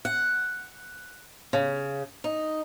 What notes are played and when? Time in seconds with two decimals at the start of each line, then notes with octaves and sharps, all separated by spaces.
0.05 F#5
1.53 C#3
2.24 D#4